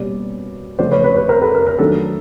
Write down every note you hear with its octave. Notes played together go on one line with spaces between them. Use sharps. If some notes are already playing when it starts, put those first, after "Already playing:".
Already playing: B2 G3 A#3 C#4 D5
C#3 F3 A3 C#4 C5 D5
B4 C#5
B4 C#5
B4 C#5
A#4 C5
A4 B4
A#4
A#4
D#3 F#3 A3 D4 A4